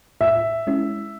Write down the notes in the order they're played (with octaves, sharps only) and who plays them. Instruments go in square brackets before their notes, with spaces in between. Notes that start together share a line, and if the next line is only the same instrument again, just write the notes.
[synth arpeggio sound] A2 [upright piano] E5
[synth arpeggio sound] G#3 C#4 E4